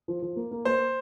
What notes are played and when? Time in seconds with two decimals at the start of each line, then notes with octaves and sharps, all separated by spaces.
0.08 F3
0.22 F3
0.36 A#3
0.51 A#3
0.65 A#3 C5